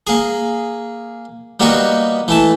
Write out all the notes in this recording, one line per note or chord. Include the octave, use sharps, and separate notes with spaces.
A#3 G#4
G3 A#3 B3 D#4 F#4
E3 A3 A5